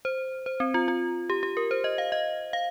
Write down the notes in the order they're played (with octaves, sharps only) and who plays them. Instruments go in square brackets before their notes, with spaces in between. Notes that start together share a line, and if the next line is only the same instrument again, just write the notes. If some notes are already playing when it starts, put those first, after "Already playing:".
[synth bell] C5
C5
C4
F4
F4
G4
G4
A#4
C5
D#5
F5
D#5
F5